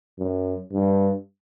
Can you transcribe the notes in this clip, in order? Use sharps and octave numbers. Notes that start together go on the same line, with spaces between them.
F#2
G2